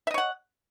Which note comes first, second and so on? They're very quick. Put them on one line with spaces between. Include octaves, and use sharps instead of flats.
E5 D#5 C#5 F#5